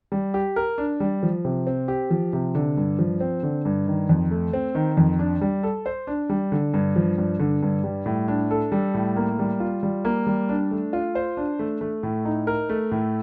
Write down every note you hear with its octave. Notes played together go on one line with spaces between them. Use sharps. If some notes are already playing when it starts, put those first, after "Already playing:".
G3
G4
A#4
D4
G3
F3
C3
C4
G4
F3
C3
D3
G2
F3
C4
D3
G2
D#3
F2
A3
C4
D#3
F2
D4
G3
A4
C5
D4
G3
D3
G2
F3
G2
D3
G2
G3
A2
D4
A4
G3
A2
A#3
G3
F4
G3
A#3
G3
D4
A3
F4
C5
D4
A3
A3
A2
D#4
A#4
A3
A2